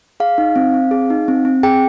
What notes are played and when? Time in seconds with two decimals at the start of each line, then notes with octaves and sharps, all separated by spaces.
0.20 G#4 F5
0.38 D#4
0.56 C4
0.74 C4
0.91 G#4
1.10 D#4
1.28 C4
1.45 C4
1.63 G#4 G5